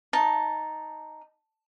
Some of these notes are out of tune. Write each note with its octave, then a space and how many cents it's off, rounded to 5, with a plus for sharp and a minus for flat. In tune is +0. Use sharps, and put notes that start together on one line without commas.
D#4 -5 A5 +0